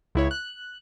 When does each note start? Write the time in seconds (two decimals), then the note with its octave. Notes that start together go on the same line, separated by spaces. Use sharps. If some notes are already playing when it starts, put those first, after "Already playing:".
0.15 C#2 E4 C#5
0.31 F#6